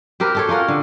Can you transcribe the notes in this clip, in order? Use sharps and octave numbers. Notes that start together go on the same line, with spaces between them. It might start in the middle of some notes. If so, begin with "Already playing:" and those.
C4 G4 A#4 B4
G4 A4 C#5
C#4 F4 A#4 F#5
D3